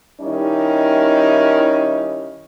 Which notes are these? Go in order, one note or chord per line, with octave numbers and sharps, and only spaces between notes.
D#3 G3 C#4 D#4 E4